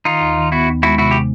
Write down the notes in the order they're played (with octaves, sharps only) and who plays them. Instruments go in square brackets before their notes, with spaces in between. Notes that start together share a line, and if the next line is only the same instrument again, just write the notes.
[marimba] D#3 [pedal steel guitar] D#4 F4
[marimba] D#2
D#3
[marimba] B3 [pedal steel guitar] E4 F#4
[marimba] D#2
[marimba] G#3 [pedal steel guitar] E4 F#4
[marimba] C3 [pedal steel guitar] E4 F#4
[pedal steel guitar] G4